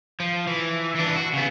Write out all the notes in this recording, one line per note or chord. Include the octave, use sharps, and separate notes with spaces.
F3
E3
E3 D4
F#4
C#3 B3